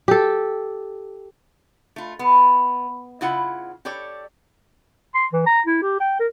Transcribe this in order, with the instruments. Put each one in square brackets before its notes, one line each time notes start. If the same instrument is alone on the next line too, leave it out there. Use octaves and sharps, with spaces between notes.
[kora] G4 A4
[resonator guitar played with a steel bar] A3 F4
B3
C#3 E4 F4 F#5
G4 A4 C#5 D5
[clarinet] C6
E3
A#5
E4
G4
G5
A#4